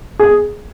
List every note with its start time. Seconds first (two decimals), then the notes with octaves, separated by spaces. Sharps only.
0.19 G#4